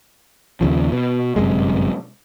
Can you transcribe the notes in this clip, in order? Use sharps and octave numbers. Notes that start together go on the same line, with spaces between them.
D#2 C#3 F3
B2
G1 F#2 C3 G#3